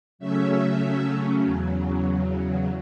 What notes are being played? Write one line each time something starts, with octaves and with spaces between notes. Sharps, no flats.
C#3 F#3 A3 C#4 E5
E2 C#3 F#3